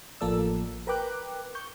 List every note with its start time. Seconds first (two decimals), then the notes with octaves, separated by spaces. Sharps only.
0.21 A1 F3 A#3 A4 D5 E6
0.87 A#4 B4 G5 D6 F#6
1.55 C#6 G6